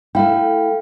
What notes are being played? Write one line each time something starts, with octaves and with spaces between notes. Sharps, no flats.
A3 E4 F5 G5